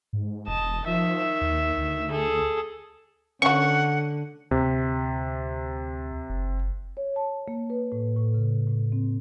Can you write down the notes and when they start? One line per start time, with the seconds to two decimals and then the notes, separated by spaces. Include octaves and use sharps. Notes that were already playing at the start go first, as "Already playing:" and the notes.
0.13 G#2
0.48 E1 D#5 A5
0.87 D#3 F3 E5
1.41 D#2
1.78 D2
2.11 G#4 A4
3.42 D3 C#4 F#4 F#5 C#6
4.51 D2 C3
6.30 F#1
6.97 C#5
7.16 A5
7.48 A#3
7.70 B4
7.92 A2
8.17 A2
8.34 C#3
8.67 A2
8.92 C4